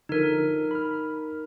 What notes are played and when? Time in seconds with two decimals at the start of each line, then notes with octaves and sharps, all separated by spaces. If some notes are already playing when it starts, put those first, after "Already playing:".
0.09 D3 F3 D#4 A4 A#4
0.71 B5 F6